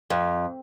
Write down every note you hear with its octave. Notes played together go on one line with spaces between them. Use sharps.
F2